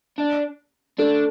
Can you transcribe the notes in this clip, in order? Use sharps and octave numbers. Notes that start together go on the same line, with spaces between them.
D4
A3 D4